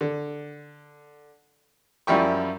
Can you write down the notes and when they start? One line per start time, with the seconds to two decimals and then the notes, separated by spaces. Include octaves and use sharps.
0.01 D3
2.07 F#2 F3 G3 E4 G5 C#6